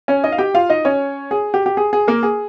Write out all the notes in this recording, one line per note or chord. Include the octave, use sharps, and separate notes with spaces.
C#4 C#5
D#4 D#5
F5
G4 G5
F4 F5
D#4 D#5
C#4 C#5
G#4
G4
G4
G#4
G#4
A#3 A#4
G#4